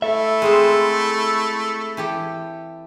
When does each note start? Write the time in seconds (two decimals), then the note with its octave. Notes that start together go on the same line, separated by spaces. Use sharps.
0.02 A3 E4 A4 E5
0.42 G#3 C4 C5
1.97 E3 G4 A4